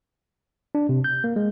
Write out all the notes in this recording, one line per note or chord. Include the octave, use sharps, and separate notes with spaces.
D4
C3
G6
A#3
G#3